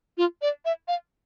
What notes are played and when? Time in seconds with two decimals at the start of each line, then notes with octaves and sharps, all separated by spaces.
0.18 F4
0.42 D5
0.65 E5
0.88 F5